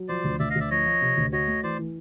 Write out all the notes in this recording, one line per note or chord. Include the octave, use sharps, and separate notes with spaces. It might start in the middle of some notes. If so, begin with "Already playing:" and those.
Already playing: F#3
F3 C5 D5
D2
D2 D5 E5
D#5 F5
D2 D5 E5
F3 C#5 D#5
F3
C3
D2
F#4 C#5 D#5
A3
E3 C5 D5
E3